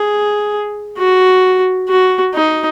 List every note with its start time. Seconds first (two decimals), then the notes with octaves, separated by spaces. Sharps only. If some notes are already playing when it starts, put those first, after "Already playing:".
Already playing: G#4
0.97 F#4
1.89 F#4
2.34 D#4